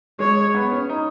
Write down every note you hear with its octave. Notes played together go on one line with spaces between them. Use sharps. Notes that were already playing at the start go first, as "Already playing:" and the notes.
G#3 C#5
B3
C#4
D#4